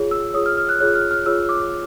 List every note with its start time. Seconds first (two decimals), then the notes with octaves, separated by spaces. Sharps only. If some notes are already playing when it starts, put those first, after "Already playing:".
Already playing: F4 G#4 C#5
0.11 E6
0.34 F4 G#4 C#5 D#6
0.46 F6
0.57 F6
0.69 F#6
0.80 F4 G#4 C#5 F#6
0.95 F6
1.11 F6
1.26 F4 G#4 C#5 E6
1.49 D6